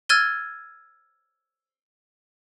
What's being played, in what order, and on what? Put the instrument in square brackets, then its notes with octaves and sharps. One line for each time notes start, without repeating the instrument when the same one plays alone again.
[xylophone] E6 F6 G#6 A6 D#7 G7